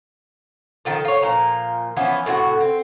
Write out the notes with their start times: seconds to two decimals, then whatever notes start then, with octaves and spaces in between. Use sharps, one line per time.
0.85 D#3 F3 A4
1.05 F4 C#5
1.22 A#2 F3 A#5
1.96 E3 F3 B3 C#4
2.26 A2 C3 F#4
2.60 C4